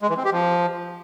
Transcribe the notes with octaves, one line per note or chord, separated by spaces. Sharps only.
G#3
E3
C4
G4
F3